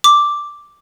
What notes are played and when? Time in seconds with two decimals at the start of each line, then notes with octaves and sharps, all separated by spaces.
0.04 D6